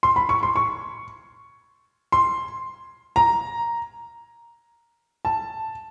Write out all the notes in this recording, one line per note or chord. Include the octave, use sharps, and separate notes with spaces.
C6
B5
C#6
C6
C#6
C6
A#5
A5